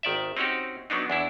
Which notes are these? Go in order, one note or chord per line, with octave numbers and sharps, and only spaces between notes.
G#1 D#3 D5 E5
C4 C#4 D#4 F#4 G4
F#3 B3 D4 D#4
E2 D4 E4